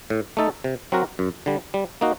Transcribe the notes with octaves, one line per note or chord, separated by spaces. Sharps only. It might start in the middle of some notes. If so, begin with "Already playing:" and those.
A2
A3 D#4 A4
C3
F#3 C4 F#4 A#4
F#2
D3 G3
G3
A#3 D#4 F#4